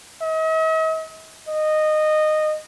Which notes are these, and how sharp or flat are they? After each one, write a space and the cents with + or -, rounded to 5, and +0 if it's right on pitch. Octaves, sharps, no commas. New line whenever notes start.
D#5 +45
D#5 -15